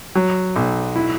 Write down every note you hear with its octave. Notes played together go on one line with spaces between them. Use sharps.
F#3
B1
E4